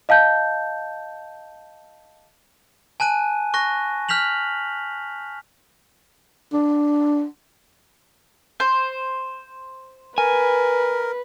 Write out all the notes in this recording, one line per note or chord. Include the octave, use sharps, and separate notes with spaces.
D#5 F5 A5 G6
G#5 A5 F#6 D#7
C#6 F#6 A#6
F6 G6 B6 F7 F#7
D4
C5
A#4 B4 G#5